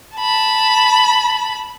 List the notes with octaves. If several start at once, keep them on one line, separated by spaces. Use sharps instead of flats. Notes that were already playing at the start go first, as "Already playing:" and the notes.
A5 B5